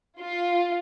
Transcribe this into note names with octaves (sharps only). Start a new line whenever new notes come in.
F4